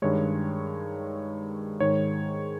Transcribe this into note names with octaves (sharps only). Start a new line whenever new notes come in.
G2 D#3 G#3 C#5
G#2 D#3 G#3 C#5